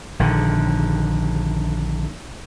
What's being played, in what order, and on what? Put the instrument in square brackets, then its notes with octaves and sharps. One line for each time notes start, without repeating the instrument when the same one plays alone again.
[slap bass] A#1 D3 D#3